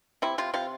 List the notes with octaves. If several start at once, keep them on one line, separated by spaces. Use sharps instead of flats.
C3 E4
C3 F4
C3 F4